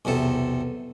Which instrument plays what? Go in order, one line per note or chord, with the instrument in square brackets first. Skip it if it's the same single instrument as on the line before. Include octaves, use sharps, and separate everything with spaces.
[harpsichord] B1 E2 C3 A4